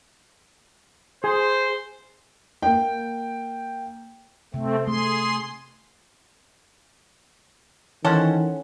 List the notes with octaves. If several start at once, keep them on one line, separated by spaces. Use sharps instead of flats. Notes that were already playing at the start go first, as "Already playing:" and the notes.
G#4 C5 G#5
A#3 G5
C3 A3 C4
A3 G#4 C6
D#3 E3 C#4 A4 C5 F#5